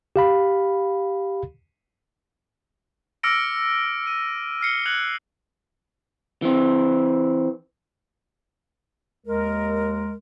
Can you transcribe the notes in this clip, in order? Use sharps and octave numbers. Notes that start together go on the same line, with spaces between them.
G4 F5 B5
D6 E6 F6 A#6 C#7 D7
C#7 D#7
F6 C7 C#7 G7
F6 F#6 G#6 F7 F#7
E3 C4
D#2 G#3 A#4